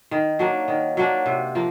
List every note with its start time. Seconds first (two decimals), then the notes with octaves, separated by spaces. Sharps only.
0.11 D#3
0.39 F#3 A#3 D4
0.68 D#3
0.97 F#3 A#3 D4
1.26 C3
1.55 F3 A#3